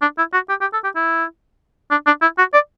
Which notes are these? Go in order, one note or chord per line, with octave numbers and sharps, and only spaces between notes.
D4
E4
F#4
G4
G4
A4
G4
E4
D4
D4
E4
F#4
D5